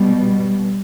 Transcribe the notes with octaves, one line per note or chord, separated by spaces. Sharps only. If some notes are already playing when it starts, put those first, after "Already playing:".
Already playing: B2 G3